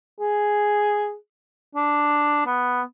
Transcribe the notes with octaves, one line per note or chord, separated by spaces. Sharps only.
G#4
D4
B3